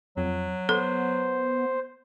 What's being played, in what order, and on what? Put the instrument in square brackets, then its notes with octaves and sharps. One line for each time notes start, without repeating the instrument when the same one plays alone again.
[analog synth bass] F2 [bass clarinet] F#3
[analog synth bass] B3 [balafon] A4 [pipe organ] C5